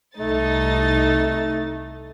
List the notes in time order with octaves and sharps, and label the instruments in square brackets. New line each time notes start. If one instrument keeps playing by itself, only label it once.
[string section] C2 D#4 A6 [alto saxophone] A3